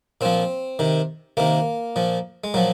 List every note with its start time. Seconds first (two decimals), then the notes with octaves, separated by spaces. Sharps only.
0.21 A#2 F3 C4
0.79 C3 D#3
1.37 C3 D#3 A#3
1.96 A#2 F3
2.44 G#3
2.54 A#2 F3 F#3